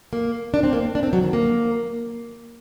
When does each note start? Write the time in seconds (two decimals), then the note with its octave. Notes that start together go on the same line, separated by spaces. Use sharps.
0.13 A#3
0.54 D4
0.63 C4
0.73 A#3
0.95 D4
1.03 C4
1.13 F#3
1.23 D#3
1.33 A#3